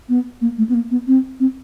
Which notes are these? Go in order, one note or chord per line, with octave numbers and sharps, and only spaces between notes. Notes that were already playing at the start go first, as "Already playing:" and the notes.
B3
A#3
A3
B3
A#3
B3
C4
C4